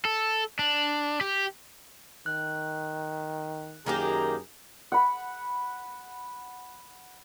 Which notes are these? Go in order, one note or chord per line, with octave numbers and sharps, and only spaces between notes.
A4
D4
G4
D#3 F#6
F#2 D#3 A#3 G4 G#4 A#5
F#5 B5